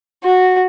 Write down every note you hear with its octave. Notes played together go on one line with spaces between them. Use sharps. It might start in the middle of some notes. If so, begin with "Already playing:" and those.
F#4